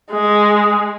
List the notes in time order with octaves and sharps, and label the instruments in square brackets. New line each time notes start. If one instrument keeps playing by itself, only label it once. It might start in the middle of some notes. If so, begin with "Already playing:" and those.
[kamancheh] G#3